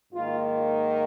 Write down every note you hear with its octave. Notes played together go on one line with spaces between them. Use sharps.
G#2 D#3 A#3 F4